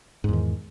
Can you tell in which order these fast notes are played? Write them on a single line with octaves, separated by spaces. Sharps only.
G#2 E2 D#3